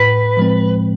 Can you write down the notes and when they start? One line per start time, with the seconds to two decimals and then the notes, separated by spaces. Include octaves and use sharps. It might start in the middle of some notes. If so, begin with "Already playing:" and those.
Already playing: A2 B4
0.37 F3 G#3 C4